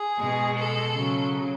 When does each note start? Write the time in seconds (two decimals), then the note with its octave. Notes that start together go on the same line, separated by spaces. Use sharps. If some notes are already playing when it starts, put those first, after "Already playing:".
Already playing: G#4
0.19 B2 G#3
0.57 A4
0.94 C#3 F#3